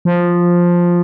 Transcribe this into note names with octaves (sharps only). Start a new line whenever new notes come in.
F3